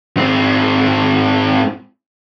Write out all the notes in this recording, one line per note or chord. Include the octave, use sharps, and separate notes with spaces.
G#2 C4